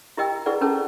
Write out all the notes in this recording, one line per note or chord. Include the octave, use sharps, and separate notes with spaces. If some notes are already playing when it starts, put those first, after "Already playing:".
E4 G4 A#4 D#5 G5 E6
E4 G#4 A#4 B4 D5 F#5
C#4 A4 A#4 C5 A5